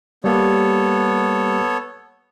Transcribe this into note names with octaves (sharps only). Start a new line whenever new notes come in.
G3 A#3 B3 G4 A4 C#5